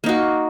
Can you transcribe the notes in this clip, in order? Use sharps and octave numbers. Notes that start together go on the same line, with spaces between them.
A#3 D#4 F#4